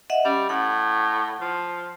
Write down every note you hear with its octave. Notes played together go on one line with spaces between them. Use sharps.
D#5 E5 F#5
G3 C#4
A2 F#5
F3